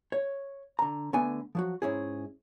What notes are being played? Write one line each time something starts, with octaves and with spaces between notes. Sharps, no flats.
C#5
D3 A#5
D3 A3 B3 G#5
F3 F#3 F#4
G#2 C#4 E4 G#4